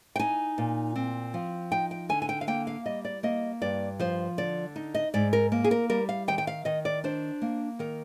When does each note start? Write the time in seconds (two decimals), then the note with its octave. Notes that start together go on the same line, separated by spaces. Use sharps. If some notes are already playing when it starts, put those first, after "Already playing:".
0.16 G5
0.19 D#4 G#5
0.58 A#2
0.95 C4
1.34 F3
1.72 D#4 G5
1.91 G5
2.09 D3 G#5
2.22 G#5
2.29 G5
2.41 F5
2.48 A#3 G5
2.67 F5
2.86 G3 D#5
3.05 D5
3.23 A#3 D#5
3.62 G2 D5
3.99 F3 C5
4.38 D3 D5
4.76 D#4
4.94 D#5
5.14 G#2 D5
5.33 A#4
5.52 A#3
5.64 G#4
5.71 A#4
5.90 G3 A#4
6.09 F5
6.28 D#3 G5
6.38 G5
6.47 F5
6.65 D#3 D#5
6.85 D5
7.04 D4 C5
7.42 A#3
7.79 D#3 A#4